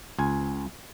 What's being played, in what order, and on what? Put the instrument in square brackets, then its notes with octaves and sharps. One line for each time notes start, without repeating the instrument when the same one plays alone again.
[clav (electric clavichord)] C#2 G#5